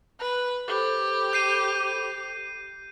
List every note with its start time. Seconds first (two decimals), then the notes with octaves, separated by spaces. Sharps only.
0.20 B4
0.68 G4 A4 C5 B5
1.33 G6 C7 D#7